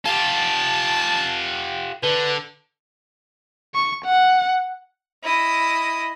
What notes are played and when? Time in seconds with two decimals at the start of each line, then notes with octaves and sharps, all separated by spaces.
0.06 F4 G4 A5
2.03 D3 B4
3.75 C#6
4.05 F#5
5.24 E4 D#5